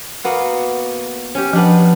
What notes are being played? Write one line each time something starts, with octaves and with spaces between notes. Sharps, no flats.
A#3 B3 F#4
C#4 G4
F3 B3 D4 G4